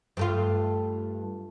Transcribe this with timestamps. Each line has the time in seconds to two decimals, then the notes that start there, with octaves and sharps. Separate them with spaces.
0.17 G2 A3 F4